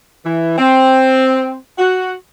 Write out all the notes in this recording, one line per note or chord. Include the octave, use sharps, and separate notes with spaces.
E3
C4
F#4